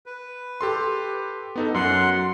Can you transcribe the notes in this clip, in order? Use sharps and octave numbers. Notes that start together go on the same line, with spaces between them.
B4
G4 A4 C6
B3 D#4 A4
F#2 F#3 F#5 C6